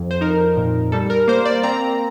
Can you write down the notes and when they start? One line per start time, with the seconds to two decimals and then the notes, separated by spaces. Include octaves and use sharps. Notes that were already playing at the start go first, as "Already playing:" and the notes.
Already playing: F2 F3
0.11 C5
0.21 D#4 A#4
0.57 A#2
0.92 G3 A4
1.10 A#4
1.28 A#3 C5
1.45 D5
1.63 C4 A#5